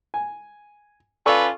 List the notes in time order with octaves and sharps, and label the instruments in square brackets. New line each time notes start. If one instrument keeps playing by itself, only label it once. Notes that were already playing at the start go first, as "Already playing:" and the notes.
[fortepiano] G#5
[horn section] C#4 F4 B4 [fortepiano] A4 D5 C#6